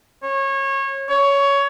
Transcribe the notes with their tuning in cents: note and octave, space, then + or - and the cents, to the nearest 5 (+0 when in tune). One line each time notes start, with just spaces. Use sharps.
C#5 -25
C#5 +15